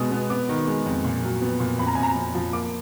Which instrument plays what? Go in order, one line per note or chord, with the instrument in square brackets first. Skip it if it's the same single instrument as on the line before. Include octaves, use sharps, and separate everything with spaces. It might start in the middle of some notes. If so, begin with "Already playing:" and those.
Already playing: [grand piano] B2 G#3 B3 D#6
B3
B3 D6
D#3
G#3
F2
A#2
F#3
B3
A#2
F2 B5
A#5
F2 G#5
A#5
F2
F3
A#3 D6